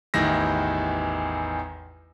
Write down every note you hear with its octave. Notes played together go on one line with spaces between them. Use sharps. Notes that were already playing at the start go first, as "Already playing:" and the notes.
A1 E2 D#3 E4 A#6